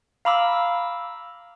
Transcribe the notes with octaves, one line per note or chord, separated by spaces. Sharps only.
F5 A#5 B5 D6 E6